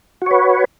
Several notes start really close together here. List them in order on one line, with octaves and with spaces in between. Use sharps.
F#4 C#5 B4